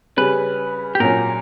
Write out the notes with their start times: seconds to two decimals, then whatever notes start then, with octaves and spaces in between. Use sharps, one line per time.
0.17 C#3 G3 C#4 B4
0.95 G4
1.00 A#2 F#3 C#4 A#4